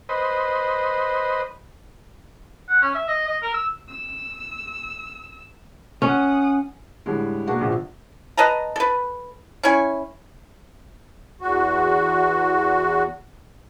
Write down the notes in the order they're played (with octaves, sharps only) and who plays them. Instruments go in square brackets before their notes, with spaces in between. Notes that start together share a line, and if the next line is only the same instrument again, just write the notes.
[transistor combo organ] B4 C5 D#5
[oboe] F#5
C#4
E5
D#5
D#5
A#4
E6
[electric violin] E6
[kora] C#4 [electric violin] F#5 D#6
[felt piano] A2 D3 G3 G#3
B2 A#3 D4 F#4
A#1 B2 D3 F3
[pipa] B4 D#5 A5 A#5
A4 B4
C#4 E4 G#5 C#6
[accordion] E2 F#4